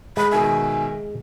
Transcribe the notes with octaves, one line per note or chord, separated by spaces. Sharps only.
G#3 B5
B2 D#3 E5 G#5